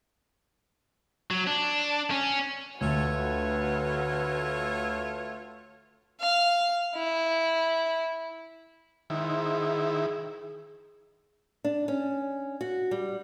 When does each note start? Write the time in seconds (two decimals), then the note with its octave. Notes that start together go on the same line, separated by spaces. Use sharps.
1.31 F#3
1.47 D4
2.10 C#4
2.81 D2 A3 F4 F#4 B4 C#5
6.20 F5
6.96 E4
9.10 G#2 D#3 E4
11.64 D4
11.88 C#4
12.61 F#4
12.91 G3